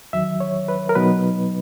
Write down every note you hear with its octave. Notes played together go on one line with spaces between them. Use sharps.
E2 D#3 F#3 E5
C#5
B4
A#4
B2 F#3 B3 D#4 B4